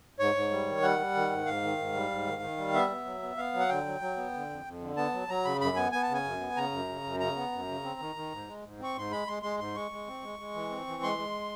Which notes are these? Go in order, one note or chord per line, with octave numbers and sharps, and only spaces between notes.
G#2 C#5
G#2
G3
D#3
G3 F#5
G3
D#3
G#2
G#2 F5
D#3
G#2
G3
G#2
D#3
D#3
G3
B3 E5
B3
F#3
B3
B3 F5
F#3
F#5
D3 G5
F#3
F#3
B3
D3
F2
F2
D3
B3 A5
F#3
F#3 A#5
C#3 B5
F#2 B5
B3 G#5
B3 G#5
A5
C#3 G#5
F#2
B3
C#3 A#5
F#2
C#3
F#2
C#3 A#5
B3
F#2
C#3
C4
D#3
D#3
G#2
G#3
G#2
C4 C#6
G#2 C6
G#3 B5
G#3 C6
G#3 C6
G#2 C6
G#3 C#6
G#3
C4
G#3
G#3
E3
C4
E3
G#3 C6
G#3